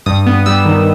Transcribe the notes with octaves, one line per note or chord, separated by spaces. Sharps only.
G2 D#6
B3
G3 E6
D#3